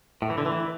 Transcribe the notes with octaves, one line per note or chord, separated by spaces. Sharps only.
A2
E3
D3
E3